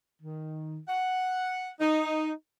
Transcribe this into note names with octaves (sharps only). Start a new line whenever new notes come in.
D#3
F#5
D#4